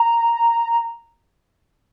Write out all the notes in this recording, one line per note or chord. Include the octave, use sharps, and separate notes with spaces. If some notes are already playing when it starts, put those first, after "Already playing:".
Already playing: A#5